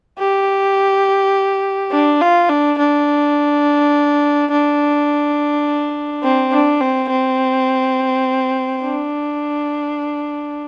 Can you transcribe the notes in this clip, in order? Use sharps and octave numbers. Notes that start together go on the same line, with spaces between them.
G4
D4
F4
D4
D4
D4
C4
D4
C4
C4
D4